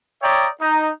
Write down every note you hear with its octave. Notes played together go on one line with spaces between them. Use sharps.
C#5 D5 E5 G5 A#5 D#6
D#4 A#5